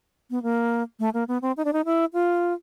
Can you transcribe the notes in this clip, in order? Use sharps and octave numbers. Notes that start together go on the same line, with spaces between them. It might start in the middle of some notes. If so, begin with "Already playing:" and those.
B3
A#3
A3
A#3
B3
C4
D#4
D4
D#4
E4
F4